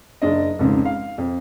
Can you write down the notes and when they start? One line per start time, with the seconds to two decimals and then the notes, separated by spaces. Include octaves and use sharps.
0.22 F#1 D4 D#5
0.59 F1 C#2 G#2 C#3
0.85 F5
1.18 F2